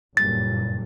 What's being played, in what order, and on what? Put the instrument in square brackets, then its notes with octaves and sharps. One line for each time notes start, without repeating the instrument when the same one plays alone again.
[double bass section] F#1 G2 A#2 [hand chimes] A6